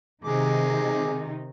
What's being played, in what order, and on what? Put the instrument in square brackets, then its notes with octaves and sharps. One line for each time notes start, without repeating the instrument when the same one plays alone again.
[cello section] C3 D#3 D#4 [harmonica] G#3 G#4 D6